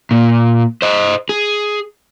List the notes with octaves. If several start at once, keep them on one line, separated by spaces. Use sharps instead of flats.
A#2
C5 D#5
G#4